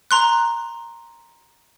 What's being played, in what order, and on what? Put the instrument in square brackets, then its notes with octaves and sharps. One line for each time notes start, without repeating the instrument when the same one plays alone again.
[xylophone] A#5 C6 F#6